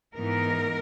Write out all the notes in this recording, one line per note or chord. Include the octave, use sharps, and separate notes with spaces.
G#2 E3 B3 D#4 A#4